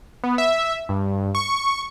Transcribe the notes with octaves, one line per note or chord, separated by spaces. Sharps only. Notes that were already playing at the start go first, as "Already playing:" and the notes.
B3
E5
G2
C#6